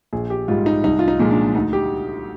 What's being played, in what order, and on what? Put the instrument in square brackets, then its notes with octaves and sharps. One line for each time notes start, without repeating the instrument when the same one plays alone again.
[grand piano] A#1 G#4
G4
G#2 G3 F4
D#4
C2 D#4
F4
D#4
A#2 F3 G#3
D4
D2 D#4
G4